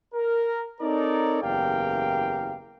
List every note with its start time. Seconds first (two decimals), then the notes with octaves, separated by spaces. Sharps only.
0.14 A#4
0.81 C4 D#4 A4 A#4 C#5 D5
1.42 F#1 E2 G4 A#4 F5 G5